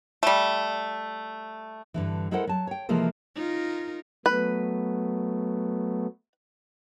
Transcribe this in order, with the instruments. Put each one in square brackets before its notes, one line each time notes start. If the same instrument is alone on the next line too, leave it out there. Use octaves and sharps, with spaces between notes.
[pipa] G3 A3
[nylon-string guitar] G2 D3 E3
G#3 E4 A4 A#4 C5 F#5
F#3 A5
C#5 G5
C3 E3 F3 G#3 A#3 A4
[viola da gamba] D#4 F4 A#4
[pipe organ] F#3 A3 B3 [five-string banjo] B4